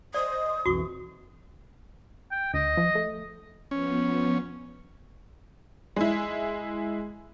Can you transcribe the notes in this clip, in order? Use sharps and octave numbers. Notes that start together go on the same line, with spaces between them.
C5 D5 D#5 D#6
B1 F2 E3 F#4 C#6
G5
D2 D#5
F3
A3
F3 B3 C#4
G#3 E4